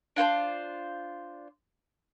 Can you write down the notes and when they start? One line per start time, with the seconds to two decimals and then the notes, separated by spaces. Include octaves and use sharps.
0.16 D4 F4 B4 C5